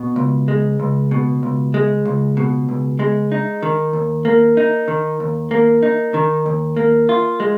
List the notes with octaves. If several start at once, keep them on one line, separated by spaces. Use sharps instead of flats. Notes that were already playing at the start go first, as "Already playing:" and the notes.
Already playing: B2
C#2
G#3
C#2
B2
C#2
G#3
C#2
B2
C#2
G#3
D#4
D#3
D#2
A#3
D#4
D#3
D#2
A#3
D#4
D#3
D#2
A#3
F4
G#3